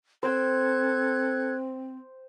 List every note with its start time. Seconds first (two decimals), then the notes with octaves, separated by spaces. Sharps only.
0.23 C4 A4 C5 G5 E6 F#6 G#6